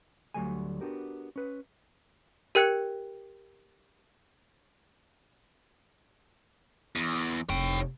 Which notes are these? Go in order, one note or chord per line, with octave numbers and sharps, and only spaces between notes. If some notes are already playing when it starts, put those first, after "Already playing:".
D2 E3 F#3 G3 A3 G#5
B3 D4 F#4 G4 A#4
C#4 B4
G4 A#4 G5 F#6 G#6 C#7
E2
F1 C#5 G5